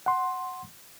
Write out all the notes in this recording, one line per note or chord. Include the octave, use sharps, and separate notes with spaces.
F#5 C6